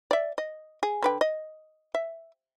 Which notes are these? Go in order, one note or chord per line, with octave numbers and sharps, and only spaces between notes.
D5 E5
D#5
G#4
D3 B4 G5
D#5
E5